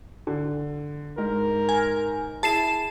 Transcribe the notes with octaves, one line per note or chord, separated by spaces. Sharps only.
D3
G#2 A#4
G#5
E4 G#4 A5 C7 E7